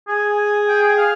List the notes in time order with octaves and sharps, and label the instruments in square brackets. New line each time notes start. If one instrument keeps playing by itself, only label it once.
[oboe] G#4 [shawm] G#5
[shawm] G#5
G5
F5